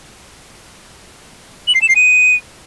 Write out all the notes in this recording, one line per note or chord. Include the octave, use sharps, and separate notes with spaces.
F#7
C7
E7
C7
D#7